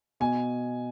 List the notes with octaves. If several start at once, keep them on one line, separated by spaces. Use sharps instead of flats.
B2 G#5